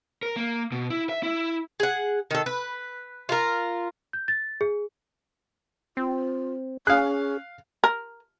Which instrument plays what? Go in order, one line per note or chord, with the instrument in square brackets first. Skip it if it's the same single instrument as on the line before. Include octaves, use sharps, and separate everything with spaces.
[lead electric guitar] A#4
A#3
B2
E4
E5
E4
[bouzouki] G#4 F#5
D#3 A4
B4
F4 A#4
[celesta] G6
A6
G#4
[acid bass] C4 [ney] F4
[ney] C#4 [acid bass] G#4 [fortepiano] F5 F#6
[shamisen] A#4